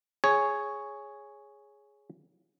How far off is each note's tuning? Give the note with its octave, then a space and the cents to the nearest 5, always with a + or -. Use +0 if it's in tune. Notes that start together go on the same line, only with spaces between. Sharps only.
G#4 +0 C#5 +0